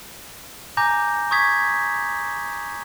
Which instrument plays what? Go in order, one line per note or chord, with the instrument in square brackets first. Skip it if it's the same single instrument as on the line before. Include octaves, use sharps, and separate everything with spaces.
[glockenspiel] G#5 A#5 D6 G6 A#6
C#6 D#6 G#6 B6